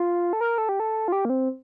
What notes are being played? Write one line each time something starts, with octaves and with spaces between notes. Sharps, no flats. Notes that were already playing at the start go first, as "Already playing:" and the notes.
Already playing: F4
A4
A#4
A4
G4
A4
F4
G4
A#3
C4